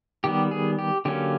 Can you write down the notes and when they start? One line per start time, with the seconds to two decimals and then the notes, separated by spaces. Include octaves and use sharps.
0.24 D#3 G3 B3 G4
0.51 G#4
0.79 G4
1.05 D3 F#3 A#3 C#4 G4